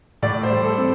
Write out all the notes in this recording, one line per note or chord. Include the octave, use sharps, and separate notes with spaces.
A2 D5
C5
G3
A4
C4